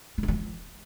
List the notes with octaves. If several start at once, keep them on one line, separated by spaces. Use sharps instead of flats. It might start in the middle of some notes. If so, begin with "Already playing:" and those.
G3
A3
F#3
F3